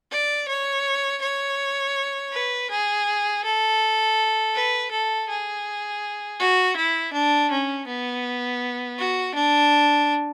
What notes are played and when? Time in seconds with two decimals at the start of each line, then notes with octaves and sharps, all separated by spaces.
0.12 D5
0.48 C#5
1.22 C#5
2.32 B4
2.70 G#4
3.45 A4
4.55 B4
4.91 A4
5.29 G#4
6.40 F#4
6.77 E4
7.13 D4
7.51 C#4
7.87 B3
8.98 F#4
9.35 D4